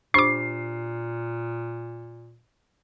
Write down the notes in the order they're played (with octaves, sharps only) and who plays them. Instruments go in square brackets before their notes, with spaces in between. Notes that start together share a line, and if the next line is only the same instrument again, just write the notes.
[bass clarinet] A#2 [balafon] D4 G4 C5 [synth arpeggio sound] C#6 D6 [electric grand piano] C7